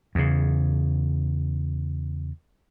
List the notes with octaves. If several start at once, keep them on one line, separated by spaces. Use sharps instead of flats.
E2 C#3